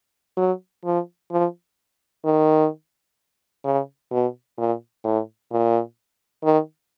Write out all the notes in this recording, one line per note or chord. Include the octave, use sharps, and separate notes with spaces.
F#3
F3
F3
D#3
C#3
B2
A#2
A2
A#2
D#3